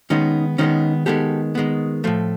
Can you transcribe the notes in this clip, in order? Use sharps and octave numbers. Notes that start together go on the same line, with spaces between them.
D#3 G#3 B3 C#4 D#4
D#3 G#3 B3 C#4 D#4
D#3 G#3 B3 G4 A4
D#3 G#3 B3
A2 F3 A3